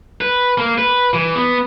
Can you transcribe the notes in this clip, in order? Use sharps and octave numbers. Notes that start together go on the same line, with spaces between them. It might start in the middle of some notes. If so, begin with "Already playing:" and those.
B4
A#3
B4
E3
B3